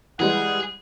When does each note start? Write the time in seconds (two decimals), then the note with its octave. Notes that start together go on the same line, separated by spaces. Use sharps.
0.20 E3 G3 G#3 G#4 F#5